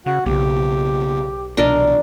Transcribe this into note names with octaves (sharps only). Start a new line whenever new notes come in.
C#3 F#4
B1 C#3 A#3 B3 G4
C2 B2 E3 D4 A#4 D#5